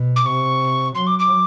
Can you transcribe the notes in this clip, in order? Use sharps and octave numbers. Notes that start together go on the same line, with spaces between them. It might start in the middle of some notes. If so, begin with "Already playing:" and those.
Already playing: B2
D6
C3 C#6
F#3 C6
D6
D6